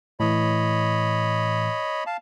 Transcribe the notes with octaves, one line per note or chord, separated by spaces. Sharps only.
A2 E3 C#5 D#5 B5
F5 A5